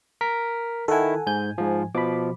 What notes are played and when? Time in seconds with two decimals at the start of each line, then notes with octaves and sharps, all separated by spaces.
0.21 A#4 A#5 B6
0.88 D#3 E4 A4 F#5 G#5
1.27 G#2 G#5 G6
1.58 G#2 F3
1.95 B2 F3 B5 D6